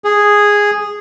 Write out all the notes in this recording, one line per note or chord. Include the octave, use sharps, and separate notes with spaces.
G#4